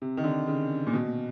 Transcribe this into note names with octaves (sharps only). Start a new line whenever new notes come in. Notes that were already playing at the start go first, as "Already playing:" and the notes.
C3
D#3
D3
C#3
A#2
B2